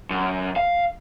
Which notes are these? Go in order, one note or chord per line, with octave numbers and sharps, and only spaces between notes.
F#2
F5